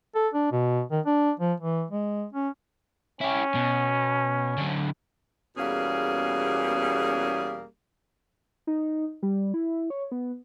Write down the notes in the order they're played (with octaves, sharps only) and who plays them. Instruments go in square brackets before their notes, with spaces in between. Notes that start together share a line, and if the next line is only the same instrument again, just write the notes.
[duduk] A4
D4
B2
D#3
D4
F3
E3
G#3
C#4
[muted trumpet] C#4 [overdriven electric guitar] E4 G4
[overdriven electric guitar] B2
D3 F#3
[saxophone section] E2 B2 G3 A#3 C#4 G#4
[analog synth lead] D#4
G3
E4
C#5
B3